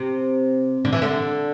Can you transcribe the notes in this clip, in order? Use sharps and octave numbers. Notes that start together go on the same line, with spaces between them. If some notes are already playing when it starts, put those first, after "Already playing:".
Already playing: C3
D3
E3
D3